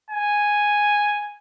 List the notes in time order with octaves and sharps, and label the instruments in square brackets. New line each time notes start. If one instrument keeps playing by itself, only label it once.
[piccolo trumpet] G#5